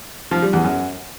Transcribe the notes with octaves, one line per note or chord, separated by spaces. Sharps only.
F3
G3
E2
F#2